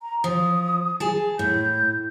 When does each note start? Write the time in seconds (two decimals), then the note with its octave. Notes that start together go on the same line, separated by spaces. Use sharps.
0.02 A#5
0.24 F3 D#6
1.00 G#4 A5
1.39 A2 G6